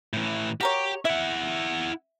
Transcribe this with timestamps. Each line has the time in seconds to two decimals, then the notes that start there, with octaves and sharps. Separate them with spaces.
0.13 A2 E3
0.61 F#4 G4 A#4 C#5
1.05 E4 E5 F#5